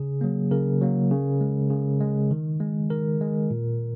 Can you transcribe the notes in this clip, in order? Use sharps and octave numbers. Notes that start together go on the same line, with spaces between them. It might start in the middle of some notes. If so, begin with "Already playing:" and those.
Already playing: C#3 G#4
F#3 A#3
C#3 A#4
F#3 A#3
C#3
G#3
C#3
G#3
D#3
G#3
D#3 A#4
G#3
A#2